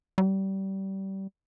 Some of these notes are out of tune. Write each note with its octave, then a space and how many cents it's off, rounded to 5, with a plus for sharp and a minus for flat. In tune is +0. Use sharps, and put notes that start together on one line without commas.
G3 -25